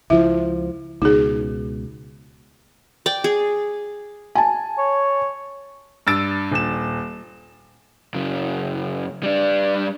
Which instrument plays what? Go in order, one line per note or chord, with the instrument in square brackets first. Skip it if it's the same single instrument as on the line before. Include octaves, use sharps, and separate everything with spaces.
[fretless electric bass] C#2 F3 [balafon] E4 E5
[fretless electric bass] C#2 B2 [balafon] D#4 G#4
[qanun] D5 G5
G#4
[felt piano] G#5 A5
[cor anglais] C#5
[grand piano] G2 E6 A6 D7
D#1 E7
[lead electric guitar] F#2 C#3
G3 D4